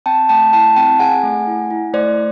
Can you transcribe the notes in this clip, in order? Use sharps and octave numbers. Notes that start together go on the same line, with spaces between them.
C4 G5 A5
A3 G5 A5
E4 G5 A5
C4 G5 A5
G#4 F#5 G#5
A3
E4
E4
A3 C5 D5